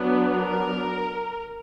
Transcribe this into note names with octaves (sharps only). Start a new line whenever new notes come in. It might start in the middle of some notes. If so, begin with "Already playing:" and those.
Already playing: F#3 B3 D4
A#4